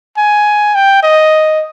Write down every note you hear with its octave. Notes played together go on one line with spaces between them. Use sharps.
G#5
G5
D#5